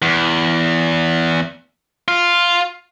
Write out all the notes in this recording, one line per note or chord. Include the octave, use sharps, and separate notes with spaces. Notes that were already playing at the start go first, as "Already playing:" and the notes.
E2
F4